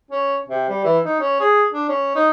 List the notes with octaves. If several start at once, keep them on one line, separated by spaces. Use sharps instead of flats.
C#4
C3
G3
E3
D#4
C#4
G#4
D4
C#4
D#4